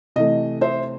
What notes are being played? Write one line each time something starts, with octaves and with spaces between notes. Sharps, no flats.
C3 E3 A3 D#5
C5 E5